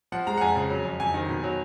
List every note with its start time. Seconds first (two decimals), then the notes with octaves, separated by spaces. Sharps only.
0.12 F3 F#5
0.27 G#3 A#5
0.37 F#5
0.41 F2 G#5
0.56 C#3
0.70 F#3
0.85 F2
1.00 F2 G#5
1.14 D#3
1.29 B2
1.44 F#3